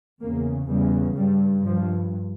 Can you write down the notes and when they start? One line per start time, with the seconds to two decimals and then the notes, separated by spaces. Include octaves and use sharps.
0.21 E2 C#3 A#3
0.69 E2 C#3 G3
1.17 G2 G3
1.65 G2 F3